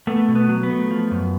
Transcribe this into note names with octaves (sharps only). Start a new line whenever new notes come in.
A3 B3
B2
B3
F#3
B3
A3
F3
F#2